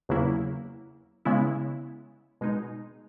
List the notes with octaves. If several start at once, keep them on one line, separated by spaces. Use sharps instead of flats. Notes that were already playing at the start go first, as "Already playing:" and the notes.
E2 C#3 F#3 A#3 E4
C#3 G#3 B3 E4
B2 G#3 D#4